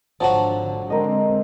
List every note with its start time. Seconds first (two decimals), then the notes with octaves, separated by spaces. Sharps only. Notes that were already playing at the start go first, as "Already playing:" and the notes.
0.21 G#1 D3 F3 F#3 F#4 A5
0.90 D3 G#3 C4 A#4 D#5